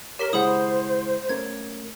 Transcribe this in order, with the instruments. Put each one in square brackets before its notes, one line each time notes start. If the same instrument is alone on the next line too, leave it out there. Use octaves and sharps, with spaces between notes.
[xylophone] G4 B6 G7 [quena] A#4 [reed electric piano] C#5
[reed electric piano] C#3 G#3 E4 [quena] C5 [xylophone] F#5 B5 D#6
[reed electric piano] A3 C#4 A#4 [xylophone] G#6